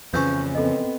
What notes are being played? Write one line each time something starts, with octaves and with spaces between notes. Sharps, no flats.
F2 C#3 E3 F3 C#4 C#6 G6
B3 C4 A4 D#5